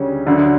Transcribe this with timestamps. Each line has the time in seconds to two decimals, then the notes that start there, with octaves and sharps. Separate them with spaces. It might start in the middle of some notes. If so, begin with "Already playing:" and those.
Already playing: D2 C#3 G3 C#4
0.26 D2 D3 F#3